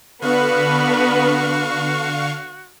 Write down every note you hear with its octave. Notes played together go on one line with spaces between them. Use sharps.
D3 B3 D4 F#4 B4 F5 C#6